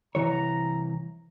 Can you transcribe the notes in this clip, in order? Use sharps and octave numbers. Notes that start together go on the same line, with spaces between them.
C2 E3 C#5 A#5